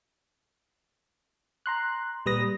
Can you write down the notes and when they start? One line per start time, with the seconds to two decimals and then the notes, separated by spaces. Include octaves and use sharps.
1.66 A#5 C6 F#6
2.26 A#2 G3 B4 D#6 A#6